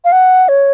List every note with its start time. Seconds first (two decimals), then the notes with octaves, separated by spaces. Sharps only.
0.05 F5
0.12 F#5
0.49 C#5